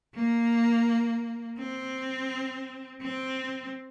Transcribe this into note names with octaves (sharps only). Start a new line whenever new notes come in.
A#3
C4
C4